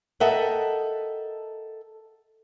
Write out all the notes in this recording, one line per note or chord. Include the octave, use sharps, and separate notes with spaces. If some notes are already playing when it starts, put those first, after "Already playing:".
A4 A#4 D#5 E5 F#5 G5